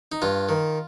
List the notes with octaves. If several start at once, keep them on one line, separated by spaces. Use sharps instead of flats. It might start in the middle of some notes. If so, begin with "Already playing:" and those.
D#4
G2 F4
D#3